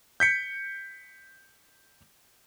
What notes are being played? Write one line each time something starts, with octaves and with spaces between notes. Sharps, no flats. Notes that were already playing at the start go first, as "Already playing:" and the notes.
G6 B6 C#7